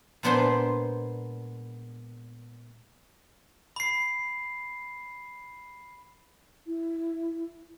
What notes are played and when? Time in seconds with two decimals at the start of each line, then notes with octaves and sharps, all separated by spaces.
0.23 A#2 G#3 B3 D4 C5 C6
3.76 B5 C7
6.67 E4